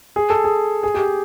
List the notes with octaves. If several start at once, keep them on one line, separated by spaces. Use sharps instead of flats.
G#4
A4
G#4
G#4
G4